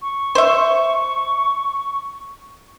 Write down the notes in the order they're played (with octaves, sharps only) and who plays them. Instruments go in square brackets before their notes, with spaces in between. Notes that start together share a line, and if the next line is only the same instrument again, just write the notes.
[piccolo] C#6
[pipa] C5 E5